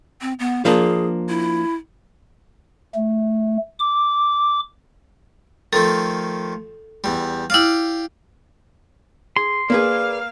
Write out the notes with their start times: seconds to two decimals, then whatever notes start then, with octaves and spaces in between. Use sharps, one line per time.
0.21 C4
0.39 B3
0.65 F3 A#3 D4 G#4
1.29 E4
2.95 A3
3.79 D6
5.73 D#3 F3 A3 A4
7.04 E2 G3
7.50 E4 G4 D5 F5 F6
9.36 G#4 C6
9.70 A#3 G#4 B4 D5 F5